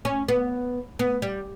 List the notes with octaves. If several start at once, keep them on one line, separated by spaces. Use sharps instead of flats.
C#4
B3
B3
G3